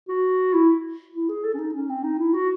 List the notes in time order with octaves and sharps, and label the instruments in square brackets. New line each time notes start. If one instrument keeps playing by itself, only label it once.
[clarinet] F#4
E4
E4
G#4
A4
C#4
D#4
C#4
C4
D#4
E4
F#4